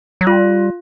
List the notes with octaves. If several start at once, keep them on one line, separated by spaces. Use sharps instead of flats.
F#3
G3 F4